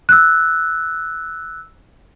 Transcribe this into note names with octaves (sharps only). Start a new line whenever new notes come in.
E6 F#6